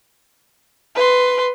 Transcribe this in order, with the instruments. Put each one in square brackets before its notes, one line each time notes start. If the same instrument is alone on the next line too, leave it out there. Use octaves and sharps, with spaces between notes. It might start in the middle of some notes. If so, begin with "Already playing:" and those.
[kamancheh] B4 C6